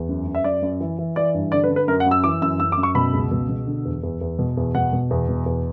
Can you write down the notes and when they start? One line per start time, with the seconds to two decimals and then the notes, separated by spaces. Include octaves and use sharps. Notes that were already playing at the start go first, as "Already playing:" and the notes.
Already playing: E2
0.09 F#2
0.27 F#2
0.35 E5
0.44 F#2 D5
0.62 F#2
0.81 E3
0.99 E3
1.16 E3 D5
1.34 G2
1.52 D3 D5
1.64 B4
1.70 D3
1.76 B4
1.88 F#2 A#4
2.00 F#5
2.06 F#2
2.11 E6
2.24 E3 D6
2.42 F#2 E6
2.60 F#2 E6
2.72 D6
2.78 F#2
2.83 C#6
2.95 B2 B5
3.13 C#2
3.31 B2
3.49 B2
3.67 D3
3.85 E2
4.03 E2
4.21 E2
4.39 B2
4.57 E2
4.75 B2 F#5
4.93 B2
5.11 E2
5.29 B2
5.46 E2